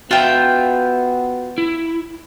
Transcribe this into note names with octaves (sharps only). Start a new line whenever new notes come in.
B3 F4 F#4 E5 G5
E4